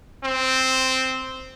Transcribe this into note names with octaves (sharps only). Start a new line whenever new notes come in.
C4